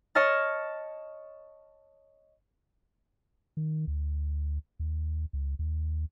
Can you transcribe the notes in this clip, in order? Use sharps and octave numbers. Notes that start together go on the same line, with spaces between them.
C#5 D#5 A5 F6 A6
D#3
D2
D#2
C#2
D#2